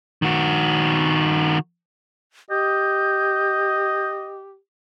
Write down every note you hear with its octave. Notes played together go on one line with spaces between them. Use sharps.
D#3 F#4
G4 D#5 G6